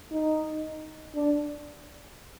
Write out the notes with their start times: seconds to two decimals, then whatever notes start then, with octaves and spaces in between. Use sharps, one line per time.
0.11 D#4
1.15 D4